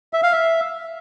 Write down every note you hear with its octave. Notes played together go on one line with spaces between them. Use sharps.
E5
F5
E5